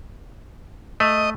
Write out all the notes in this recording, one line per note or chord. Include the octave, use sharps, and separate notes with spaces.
A3 D#5